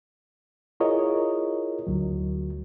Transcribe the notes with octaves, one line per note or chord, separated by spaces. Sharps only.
E4 F4 G#4 A#4 C#5 D#5
D2 F#3